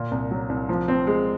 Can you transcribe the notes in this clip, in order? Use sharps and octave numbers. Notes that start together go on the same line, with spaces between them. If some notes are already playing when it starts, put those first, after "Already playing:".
Already playing: A#2
C2
F#3
C2
F3
C4
G#3